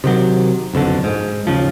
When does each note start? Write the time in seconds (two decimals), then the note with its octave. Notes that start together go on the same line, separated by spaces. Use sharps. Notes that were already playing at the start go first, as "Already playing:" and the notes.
0.04 C3 D#3 F#3
0.73 F#1 B1 F2 D3
1.04 G#2
1.47 D#2 C#3 F3